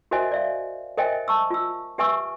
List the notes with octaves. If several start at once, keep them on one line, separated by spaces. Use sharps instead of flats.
F#4 A#4 C5 D#5 E5 G#5
D5 E5 F5
A#4 C5 D#5 E5 G5 G#5
A5 C#6 E6
F4 E6
G4 B4 E5 G#5 C#6 E6